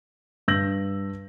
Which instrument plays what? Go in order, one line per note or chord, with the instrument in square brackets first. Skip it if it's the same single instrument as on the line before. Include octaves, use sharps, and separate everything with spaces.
[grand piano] G2 E6 G6 A#6 F#7